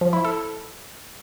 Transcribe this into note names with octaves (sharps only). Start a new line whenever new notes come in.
F3
E4
A4